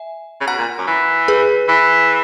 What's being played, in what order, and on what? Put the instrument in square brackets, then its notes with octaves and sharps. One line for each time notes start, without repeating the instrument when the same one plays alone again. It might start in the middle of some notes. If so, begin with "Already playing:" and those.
Already playing: [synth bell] E5 G#5
[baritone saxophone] C#3
[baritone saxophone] B2 [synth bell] F#5 A#5
[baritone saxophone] A#2
F#2
E3
[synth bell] G#4 B4
[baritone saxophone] E3